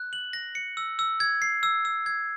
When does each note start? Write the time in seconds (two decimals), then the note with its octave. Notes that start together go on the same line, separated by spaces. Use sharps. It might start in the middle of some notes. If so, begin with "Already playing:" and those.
Already playing: F#6
0.13 F#7
0.33 A#6
0.55 C#7
0.77 E6
0.99 E6
1.20 G#6
1.42 C7
1.63 E6
1.85 E6
2.06 G#6